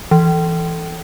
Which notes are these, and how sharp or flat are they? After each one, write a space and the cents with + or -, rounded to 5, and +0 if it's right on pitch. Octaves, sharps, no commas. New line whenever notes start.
E3 +10